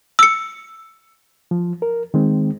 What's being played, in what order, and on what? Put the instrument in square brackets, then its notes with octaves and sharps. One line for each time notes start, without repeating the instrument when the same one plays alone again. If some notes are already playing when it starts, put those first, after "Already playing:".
[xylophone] E6 C#7
[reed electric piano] F3
A#4
D#3 G#3 C4